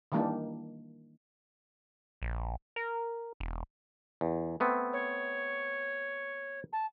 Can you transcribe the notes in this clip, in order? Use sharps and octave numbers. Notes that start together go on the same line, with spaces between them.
D#3 E3 G3 A#3 D4 D#4
A#1
A#4
E1
E2
A3 B3 C4
C#5
A5